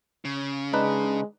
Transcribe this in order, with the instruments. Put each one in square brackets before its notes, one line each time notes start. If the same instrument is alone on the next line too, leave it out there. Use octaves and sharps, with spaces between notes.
[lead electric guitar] C#3
[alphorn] G#3 [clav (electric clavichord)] D4 D#4 B4